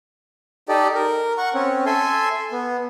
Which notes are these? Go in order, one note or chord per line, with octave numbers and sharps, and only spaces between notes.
D#4 G4 A4 D5 D#5
A#4
F#5 C#6
C4 C#4
A4 E5 G#5 C6
B3